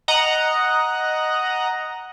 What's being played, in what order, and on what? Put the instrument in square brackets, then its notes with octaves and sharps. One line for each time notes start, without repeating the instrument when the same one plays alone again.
[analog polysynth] D#5 F#5 A#5